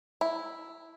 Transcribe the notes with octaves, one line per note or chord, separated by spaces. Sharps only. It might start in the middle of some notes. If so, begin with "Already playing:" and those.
E4